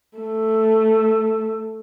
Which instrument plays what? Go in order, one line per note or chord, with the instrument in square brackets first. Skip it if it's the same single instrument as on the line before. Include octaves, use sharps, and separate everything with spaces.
[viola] A3